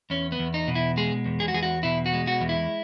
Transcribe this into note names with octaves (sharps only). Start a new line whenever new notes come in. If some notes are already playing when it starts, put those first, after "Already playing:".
E2 C#4
B3
E2
D#4
B2
E4
G#3 G#4
E2
G#4
F#4
E2 G#4
F#4
B2 E4
F#4
G#3
F#4
E2
E4